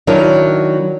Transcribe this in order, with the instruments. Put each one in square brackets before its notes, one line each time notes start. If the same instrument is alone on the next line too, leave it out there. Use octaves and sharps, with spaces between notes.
[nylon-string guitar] D#3 F#3 D4 E4 A#4